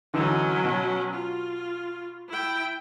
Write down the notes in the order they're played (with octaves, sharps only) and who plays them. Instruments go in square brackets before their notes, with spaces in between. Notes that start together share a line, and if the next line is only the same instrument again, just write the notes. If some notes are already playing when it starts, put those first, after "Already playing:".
[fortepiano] D3 E3 D#4 [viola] F#3 C#4
[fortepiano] B2
[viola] F4
E4 G5